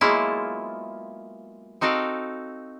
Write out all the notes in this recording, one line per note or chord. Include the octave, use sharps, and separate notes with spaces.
F#3 G#3 A#3 B3 E4 F4
C4 D#4 F#4 A4 F5 G5